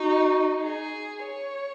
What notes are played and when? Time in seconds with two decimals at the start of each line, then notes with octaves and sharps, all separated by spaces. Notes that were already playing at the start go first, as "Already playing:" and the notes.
Already playing: D#4 F#4
0.63 G#4
1.25 C#5